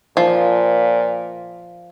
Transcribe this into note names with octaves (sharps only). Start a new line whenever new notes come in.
A#2 F3